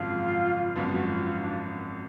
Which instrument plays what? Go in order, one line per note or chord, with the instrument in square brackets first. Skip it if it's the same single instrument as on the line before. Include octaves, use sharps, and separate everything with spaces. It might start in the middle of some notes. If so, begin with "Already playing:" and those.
Already playing: [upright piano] G#1 F#2 C#3 F3 [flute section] F4
[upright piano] G#1 F#2 F3 B3
[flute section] F#4
F4
F4
D4